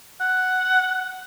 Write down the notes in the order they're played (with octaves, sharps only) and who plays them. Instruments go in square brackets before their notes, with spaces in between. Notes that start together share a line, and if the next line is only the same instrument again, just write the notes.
[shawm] F#5